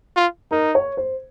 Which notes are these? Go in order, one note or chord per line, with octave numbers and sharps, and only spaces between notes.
F4
D#4 A#4
C#5
C5